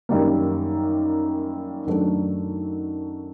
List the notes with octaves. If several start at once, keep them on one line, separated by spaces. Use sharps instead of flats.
F#2 D#3 G3 A#3
F#2 D#3 F#3 A3 D4